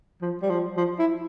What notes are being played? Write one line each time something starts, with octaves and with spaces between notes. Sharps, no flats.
F3
G3
F3
F3
E4